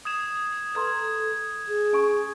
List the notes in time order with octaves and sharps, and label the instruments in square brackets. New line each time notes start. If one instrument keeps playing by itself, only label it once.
[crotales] D#6 G#6 E7
[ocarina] A4 [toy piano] B4 A#5 C6 [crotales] G#6
[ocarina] G#4
[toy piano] C#4 G#5 C#6